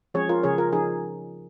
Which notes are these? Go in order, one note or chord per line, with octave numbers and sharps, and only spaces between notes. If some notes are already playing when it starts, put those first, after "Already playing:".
F3 G#3 C#4 G#4 C#5
F4 A#4
C#3 F3 C#4 G#4 C#5
F4 A#4
F3 C#4 D#4 G#4